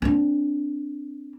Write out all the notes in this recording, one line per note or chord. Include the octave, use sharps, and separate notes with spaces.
C4 D4